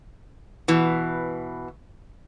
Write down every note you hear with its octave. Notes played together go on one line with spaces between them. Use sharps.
B2 E3